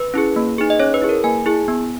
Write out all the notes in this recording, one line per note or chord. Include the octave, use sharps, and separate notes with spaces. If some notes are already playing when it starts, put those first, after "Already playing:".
Already playing: B4
C#4 E4 G#4
A#3
D#4 G#4
D#5
C#4 C#5
B4
E4 G#4
A#4
A#3 G#5
E4 G#4
B3